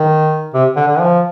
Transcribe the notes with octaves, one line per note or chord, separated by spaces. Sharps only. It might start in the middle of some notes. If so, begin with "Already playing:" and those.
Already playing: D#3
C3
D3
D3
F3